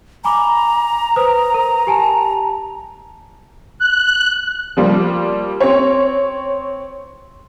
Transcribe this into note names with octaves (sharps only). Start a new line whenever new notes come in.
G#5 A#5 B5 D6
B4 C5 D#6
A#4
G4 G#5 A5
F#6
F3 G3 A#3
C4 C#5